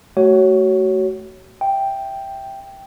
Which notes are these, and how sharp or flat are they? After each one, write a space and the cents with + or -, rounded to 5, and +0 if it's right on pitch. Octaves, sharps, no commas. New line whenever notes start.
A3 +0 F#4 +30 C#5 +0
E5 +0 G5 +0